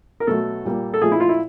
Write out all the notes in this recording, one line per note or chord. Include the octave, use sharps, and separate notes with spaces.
A#4
B2 F#3 A3 A4
A#2 G3 A#3
A4
A#2 F3 A3 G#4
E4
F4
E4